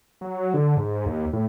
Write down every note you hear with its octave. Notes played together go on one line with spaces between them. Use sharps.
F#3
D3
G#2
D#2
A2